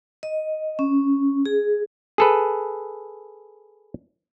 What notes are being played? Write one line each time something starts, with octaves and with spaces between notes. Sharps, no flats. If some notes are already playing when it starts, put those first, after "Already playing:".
D#5
C#4
G#4
G#4 A4 B4